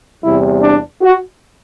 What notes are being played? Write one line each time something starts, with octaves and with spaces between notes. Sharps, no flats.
E2 C3 G3 E4
D4
F#4